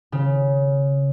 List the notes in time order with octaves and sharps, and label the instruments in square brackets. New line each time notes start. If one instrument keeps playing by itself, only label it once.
[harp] C#3